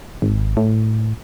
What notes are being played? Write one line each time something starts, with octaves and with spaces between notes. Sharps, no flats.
G#1
A2